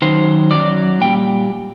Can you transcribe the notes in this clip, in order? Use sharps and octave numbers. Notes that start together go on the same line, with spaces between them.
F#2 D#3 F#3 C5
F#2 D#3 F#3 D5
A#2 G3 G5